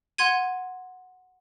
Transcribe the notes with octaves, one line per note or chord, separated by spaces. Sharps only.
F#5 C6 G#6 D#7